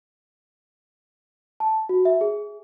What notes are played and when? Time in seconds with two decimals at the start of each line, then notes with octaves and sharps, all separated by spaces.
1.60 A5
1.89 F#4
2.05 E5
2.21 G#4